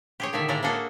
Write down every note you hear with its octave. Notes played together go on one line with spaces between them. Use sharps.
G4 G#4 C#5
A#2 D3 D#3 D5 E5
A2 G#3 A#3 C#5 D5 A#5
A#3 C#4 D4 F#4 G#4 A4